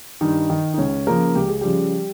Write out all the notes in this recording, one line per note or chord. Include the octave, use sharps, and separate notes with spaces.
G2 D#3 D#4
D#3
D#4
C#2 C#4
C#3 F3 A#3 A#4
C#2 G4
G#4
C#3 F3 G3 G4